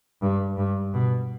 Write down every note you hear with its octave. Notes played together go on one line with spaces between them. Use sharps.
G2
G2
B2